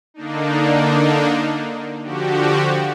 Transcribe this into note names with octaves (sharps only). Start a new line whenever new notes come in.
D3 A#3 D4 D#4
D3 F3 F#4 G4